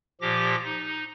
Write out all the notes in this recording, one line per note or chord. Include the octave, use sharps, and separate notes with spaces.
A#2 F3 G4 D6 A#6
D#4